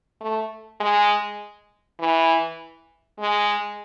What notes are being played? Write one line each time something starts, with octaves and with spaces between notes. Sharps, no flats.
A3
G#3
E3
G#3